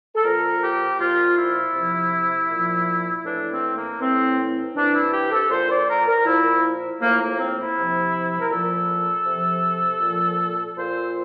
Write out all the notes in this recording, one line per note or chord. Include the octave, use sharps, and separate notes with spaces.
A4
A#2 F3 A#4
G4
A#2 F3 F4
E4
C3 F3
A#2 F3
A2 E3 D4
C4
A#3
A2 E3 C4
C3 E3 D4
E4
G4
A4
A#2 F3 C5
D5
A#4
A#4
A#2 F3 E4
A2 F3 A#3
A#3
C4
E4
C3 F3
A#4
A#2 F3 A4
C3 F3
A#2 F3
A#2 F3 C5